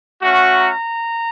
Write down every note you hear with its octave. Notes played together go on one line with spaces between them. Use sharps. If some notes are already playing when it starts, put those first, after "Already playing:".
A3 C#4 F#4
A#5